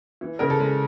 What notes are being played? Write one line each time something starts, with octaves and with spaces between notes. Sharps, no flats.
E3
C#3 A#4
A4
G#3